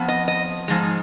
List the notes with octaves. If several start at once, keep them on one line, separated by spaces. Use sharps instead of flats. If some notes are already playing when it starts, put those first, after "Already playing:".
Already playing: F2 F3 B3
D#5
D#5
G#2 F3 G#3